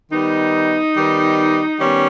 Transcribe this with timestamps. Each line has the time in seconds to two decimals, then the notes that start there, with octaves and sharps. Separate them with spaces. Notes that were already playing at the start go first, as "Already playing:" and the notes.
0.11 D#3 G3 B3 D#4
0.96 D#3 G3 B3
1.78 D#3 G3 B3 C#4